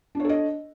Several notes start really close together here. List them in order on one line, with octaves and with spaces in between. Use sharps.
D4 C#5 A4 D#5